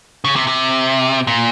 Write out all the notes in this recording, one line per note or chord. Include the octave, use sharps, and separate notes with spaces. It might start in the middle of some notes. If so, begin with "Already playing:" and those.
C#3
C3
C3
A#2